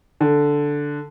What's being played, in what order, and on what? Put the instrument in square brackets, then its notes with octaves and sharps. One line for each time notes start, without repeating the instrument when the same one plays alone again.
[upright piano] D3